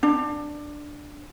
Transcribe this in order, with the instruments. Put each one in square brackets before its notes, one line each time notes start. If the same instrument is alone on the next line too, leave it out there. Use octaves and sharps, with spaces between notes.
[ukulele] D4